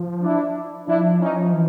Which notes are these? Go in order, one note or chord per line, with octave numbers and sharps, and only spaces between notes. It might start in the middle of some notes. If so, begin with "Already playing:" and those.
Already playing: F3
D4 E4
F3 D4 E4
C#4 D#4
E3